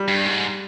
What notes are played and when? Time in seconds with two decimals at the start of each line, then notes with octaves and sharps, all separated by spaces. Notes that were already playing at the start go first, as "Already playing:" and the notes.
Already playing: G3
0.08 G2
0.26 G#2